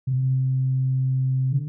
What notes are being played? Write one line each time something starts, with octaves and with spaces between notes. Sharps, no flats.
C3
D3